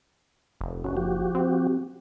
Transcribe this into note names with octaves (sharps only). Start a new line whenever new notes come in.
F1
F#1 C#4 F#4
F3 F#4 G4
C4